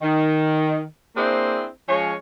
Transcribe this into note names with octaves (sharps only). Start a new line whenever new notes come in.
D#3
A#3 C4 D4 E4 G#4 C5
F3 G#3 C#4 C#5